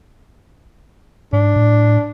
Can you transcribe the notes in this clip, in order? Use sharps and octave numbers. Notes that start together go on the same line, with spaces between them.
G#2 D4
A2